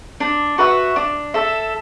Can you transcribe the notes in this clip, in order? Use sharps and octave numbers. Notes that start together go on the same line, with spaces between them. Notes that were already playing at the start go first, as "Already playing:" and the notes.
D4
F#4 B4 E5
D4
A4 E5